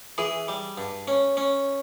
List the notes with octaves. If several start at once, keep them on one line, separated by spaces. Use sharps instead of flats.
E3 G#4
G3
G2
C#4
C#4